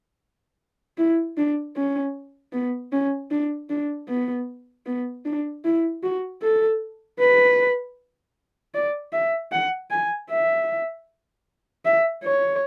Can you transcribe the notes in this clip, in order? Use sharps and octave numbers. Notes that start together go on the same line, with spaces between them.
E4
D4
C#4
B3
C#4
D4
D4
B3
B3
D4
E4
F#4
A4
B4
D5
E5
F#5
G#5
E5
E5
C#5